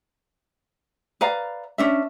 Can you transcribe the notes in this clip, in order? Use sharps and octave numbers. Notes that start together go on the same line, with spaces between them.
B4 D5 F5 A#5
C#4 D4 E5